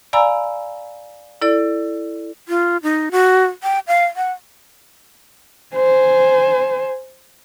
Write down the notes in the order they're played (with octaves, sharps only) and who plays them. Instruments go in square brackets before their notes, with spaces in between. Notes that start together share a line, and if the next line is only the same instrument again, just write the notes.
[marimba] D5 F5 G#5 A#5 B5 E6
E4 A4 D5
[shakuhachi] F4
D#4
F#4
G5
F5
F#5
[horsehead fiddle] C5 G#5